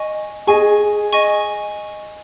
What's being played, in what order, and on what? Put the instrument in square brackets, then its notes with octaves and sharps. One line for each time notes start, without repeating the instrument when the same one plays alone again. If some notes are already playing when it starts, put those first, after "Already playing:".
Already playing: [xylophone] D#5 G#5 C#6
[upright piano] G#4 [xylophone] D#5 G#5 C#6
[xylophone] D#5 G#5 C#6